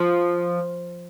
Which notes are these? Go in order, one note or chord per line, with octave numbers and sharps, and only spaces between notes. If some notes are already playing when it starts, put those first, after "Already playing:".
Already playing: F3